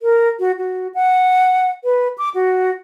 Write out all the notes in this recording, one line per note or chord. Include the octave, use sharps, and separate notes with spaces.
A#4
F#4
F#4
F#5
B4
D6
F#4